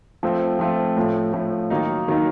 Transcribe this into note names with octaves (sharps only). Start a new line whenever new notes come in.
F3 A3 C4 F4
F3 A3 C4 F4
A2 F3 A3
A2 F3 A3
D#3 F#3 A#3 D#4
D#3 F#3 A#3 D#4